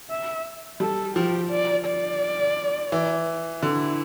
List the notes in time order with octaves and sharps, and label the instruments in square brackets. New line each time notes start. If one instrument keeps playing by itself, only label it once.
[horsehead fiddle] E5
[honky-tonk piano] G3 [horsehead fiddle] A4
[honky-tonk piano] F3 [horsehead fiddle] G4
[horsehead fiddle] D5
D5
[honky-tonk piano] E3
[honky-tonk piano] D3 [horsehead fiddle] E4